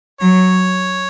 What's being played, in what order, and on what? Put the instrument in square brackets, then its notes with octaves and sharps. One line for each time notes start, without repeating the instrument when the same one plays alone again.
[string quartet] F#3 [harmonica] C#5